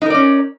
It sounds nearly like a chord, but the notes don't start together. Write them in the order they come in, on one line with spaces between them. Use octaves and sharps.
D#4 A#4 D5 C#4